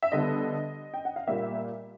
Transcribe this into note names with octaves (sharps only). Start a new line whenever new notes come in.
E5
D3 G3 B3 D#5
G5
F#5
F5
A#2 G3 A#3 E5